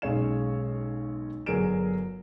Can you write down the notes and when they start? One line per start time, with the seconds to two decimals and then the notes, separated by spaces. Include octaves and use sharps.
0.02 B1 G#3 C#4 C#5 F5 E7
1.46 G1 F#3 G#4 A#4 D7 E7